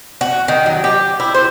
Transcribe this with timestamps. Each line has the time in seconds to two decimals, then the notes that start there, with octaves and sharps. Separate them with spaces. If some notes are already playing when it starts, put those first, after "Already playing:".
0.21 F#4
0.48 D#3
0.66 F#3
0.84 G4
1.20 E4
1.34 C5